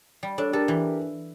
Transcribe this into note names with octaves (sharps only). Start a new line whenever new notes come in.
G3
D4 A4 C#5
G4 A4 A#4
E3